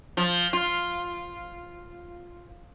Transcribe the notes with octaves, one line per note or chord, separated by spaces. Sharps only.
F3
F4